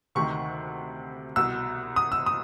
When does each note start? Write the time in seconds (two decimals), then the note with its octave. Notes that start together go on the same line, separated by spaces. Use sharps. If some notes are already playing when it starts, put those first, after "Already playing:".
0.15 D2 C3 D#3 C#6
1.36 C2 B2 E6
1.96 D#6
2.12 E6
2.26 D#6